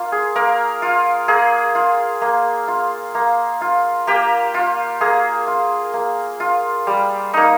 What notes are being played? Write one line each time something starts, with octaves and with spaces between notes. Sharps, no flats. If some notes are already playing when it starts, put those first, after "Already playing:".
Already playing: A#3 F4
G#4
A#3 A#4
F4
A#3 G#4
F4
A#3
F4
A#3
F4
A#3 G4
F4
A#3 G#4
F4
A#3
F4
G3
A#3 D#4